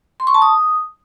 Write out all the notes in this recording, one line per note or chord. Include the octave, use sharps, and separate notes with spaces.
C6
C#6
A5
D#6